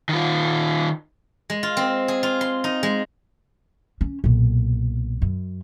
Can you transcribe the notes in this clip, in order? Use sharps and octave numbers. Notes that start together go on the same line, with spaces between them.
D#3 F4
G#3
F4
C4
G#4
F4
C6
D#4
G#3
C#4
B1 A#2
F#2